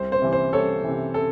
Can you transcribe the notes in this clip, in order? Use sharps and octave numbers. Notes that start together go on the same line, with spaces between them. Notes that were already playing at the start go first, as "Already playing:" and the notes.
Already playing: C2 C5
C5
C3 E3
C5
C2 A4 C#5
C3 E3
A4